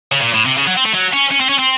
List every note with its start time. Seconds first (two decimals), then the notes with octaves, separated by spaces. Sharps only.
0.12 C#3
0.22 A#2
0.34 A2
0.46 C3
0.58 C#3
0.67 F#3
0.77 C4
0.85 A3
0.94 F#3
1.14 C#4
1.32 C#4
1.41 C4
1.49 C#4
1.59 C4